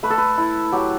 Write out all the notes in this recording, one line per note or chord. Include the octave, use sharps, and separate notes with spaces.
A3 B4
A4
B4
E4
F#3 G4